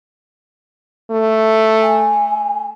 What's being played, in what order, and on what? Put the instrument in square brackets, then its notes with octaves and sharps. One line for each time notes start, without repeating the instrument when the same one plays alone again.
[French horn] A3
[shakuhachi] G#5